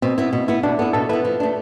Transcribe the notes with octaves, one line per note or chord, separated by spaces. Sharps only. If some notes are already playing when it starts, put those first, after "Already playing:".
B2 C4
B3 E4
B2
B3 E4
B2 D4
B3 E4 A4
B2 A4
B3 E4 B4
F3
A3 D4